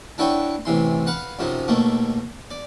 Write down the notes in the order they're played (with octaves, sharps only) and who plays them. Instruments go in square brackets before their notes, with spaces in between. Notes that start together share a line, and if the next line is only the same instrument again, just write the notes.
[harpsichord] D4 E4 F#4 B4 C#5 G5
A1 C3 E3 C6
B4 F5 F#5
F#2 C3 F3 D#4
D#2 B2 A3 A#3
D5